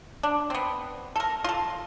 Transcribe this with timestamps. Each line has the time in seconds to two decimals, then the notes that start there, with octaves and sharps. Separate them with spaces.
0.23 D4
0.50 B3 C4
1.16 A4 A#4
1.44 F4 A4